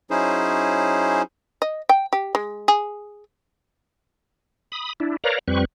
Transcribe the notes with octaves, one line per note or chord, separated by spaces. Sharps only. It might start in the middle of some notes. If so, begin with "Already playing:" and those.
F#3 C#4 D#4 E4 G#4 C5
D#5
G5
G4
G#3
G#4
B5 D#6
D4 E4
A#4 B4 C#5 D5 F5 A#5
F2 G3 C4 B4 C#6